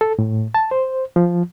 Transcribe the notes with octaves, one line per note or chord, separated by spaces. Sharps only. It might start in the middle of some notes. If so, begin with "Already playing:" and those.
A4
A2
A5
C5
F3